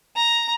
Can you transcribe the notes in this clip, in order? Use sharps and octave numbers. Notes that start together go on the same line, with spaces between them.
A#5